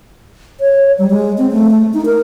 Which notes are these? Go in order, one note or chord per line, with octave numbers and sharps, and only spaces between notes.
C#5
G3
G#3
C4
A3
A3
D#4
A#4